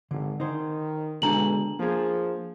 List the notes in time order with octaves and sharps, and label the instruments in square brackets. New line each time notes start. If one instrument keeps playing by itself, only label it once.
[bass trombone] G#1 [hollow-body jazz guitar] D3
[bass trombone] D#3 [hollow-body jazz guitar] D#4 C5
[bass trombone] B2 [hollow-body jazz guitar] D3 G#3 A4 [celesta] D4 A#5 F#7
[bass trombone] F3 [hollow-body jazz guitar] A#3 G#4